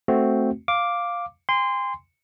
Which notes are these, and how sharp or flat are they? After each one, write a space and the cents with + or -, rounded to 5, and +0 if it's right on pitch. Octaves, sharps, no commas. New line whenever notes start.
A3 +0 C4 +0 F#4 +0
F5 +0 D6 +0
G#5 -45 C6 -15